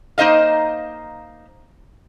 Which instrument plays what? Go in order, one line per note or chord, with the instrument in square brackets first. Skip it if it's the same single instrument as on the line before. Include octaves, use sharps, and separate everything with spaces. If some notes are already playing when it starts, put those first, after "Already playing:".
[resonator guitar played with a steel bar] A#3 D#4 C5 D#5 F5